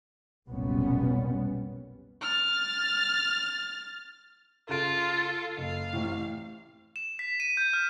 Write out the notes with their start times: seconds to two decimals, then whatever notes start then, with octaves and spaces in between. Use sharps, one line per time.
0.47 F1 B1 A#2 G3 B3 C#4
2.22 F6 A6
4.69 C#3 F4 A4 D7
5.58 F#1 F5
5.93 A1 A2 C3
6.96 E7
7.19 B6
7.40 D#7
7.57 G6
7.73 F6